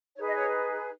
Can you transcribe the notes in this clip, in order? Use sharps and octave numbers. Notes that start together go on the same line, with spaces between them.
D#4 G#4 B4 C#5
D#5
C#5